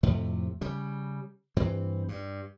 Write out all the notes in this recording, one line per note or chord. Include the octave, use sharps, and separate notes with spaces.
F2 A2 C3 A3
C#3 G3
G2 E3 C4
G2